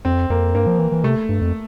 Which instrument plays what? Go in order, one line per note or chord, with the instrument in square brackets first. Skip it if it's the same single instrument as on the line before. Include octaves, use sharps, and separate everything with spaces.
[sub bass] F2 [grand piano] C4
[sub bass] F2 [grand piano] A#3
[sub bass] G2 [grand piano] A#3
[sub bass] F3
E3
E3
[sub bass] C3 [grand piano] A3
[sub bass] G2
F2